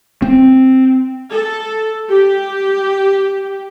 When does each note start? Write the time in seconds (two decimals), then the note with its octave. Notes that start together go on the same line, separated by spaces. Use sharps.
0.22 C4
1.30 A4
2.10 G4